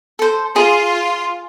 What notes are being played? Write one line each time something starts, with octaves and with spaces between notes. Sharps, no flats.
A4 C5
F4 G#4